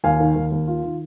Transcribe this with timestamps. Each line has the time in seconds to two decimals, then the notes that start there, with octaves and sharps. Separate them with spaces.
0.04 D#2 F5 G#5
0.20 D#3
0.36 D#2
0.52 D#2
0.68 F4
0.83 D#3